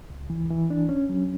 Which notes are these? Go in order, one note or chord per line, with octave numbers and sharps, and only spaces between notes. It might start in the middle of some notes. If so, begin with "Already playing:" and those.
C#2
E3
E3
D4
C#4
F#3